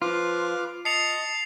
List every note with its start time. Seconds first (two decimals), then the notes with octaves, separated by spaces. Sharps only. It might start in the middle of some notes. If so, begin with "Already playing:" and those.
0.02 F3 F4 B4 D6 F6
0.85 D#5 A5 C7 C#7 F7